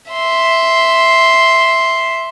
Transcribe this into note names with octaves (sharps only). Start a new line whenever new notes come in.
E5 C6